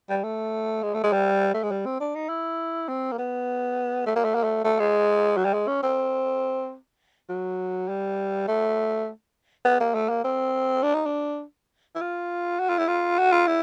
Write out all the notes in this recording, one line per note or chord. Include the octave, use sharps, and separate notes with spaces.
G3
A3
G#3
A3
G#3
G3
A3
G#3
G3
C4
D4
D#4
E4
C4
A#3
B3
A3
A#3
A3
A#3
A3
A3
G#3
F#3
G3
G#3
C#4
C4
F#3
G3
A3
B3
A#3
A3
A#3
C4
D4
D#4
D4
E4
F4
F#4
F4
E4
F4
F#4
F4
E4